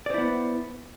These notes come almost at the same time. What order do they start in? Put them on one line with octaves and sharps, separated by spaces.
D5 C5 E4 B3